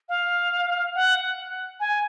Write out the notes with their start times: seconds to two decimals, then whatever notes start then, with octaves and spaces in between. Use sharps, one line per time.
0.09 F5
0.95 F#5
1.80 G#5